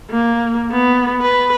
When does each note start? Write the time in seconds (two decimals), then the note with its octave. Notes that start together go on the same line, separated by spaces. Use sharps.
0.10 A#3
0.72 B3
1.22 B4